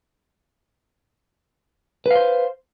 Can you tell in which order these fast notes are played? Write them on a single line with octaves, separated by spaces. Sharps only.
B4 F5 C5